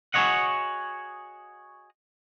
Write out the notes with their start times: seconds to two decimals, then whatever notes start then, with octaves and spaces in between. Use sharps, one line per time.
0.14 F#4 G#4 A4 C#5 D#5 F#5